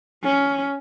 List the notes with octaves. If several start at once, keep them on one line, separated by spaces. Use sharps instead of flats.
C#4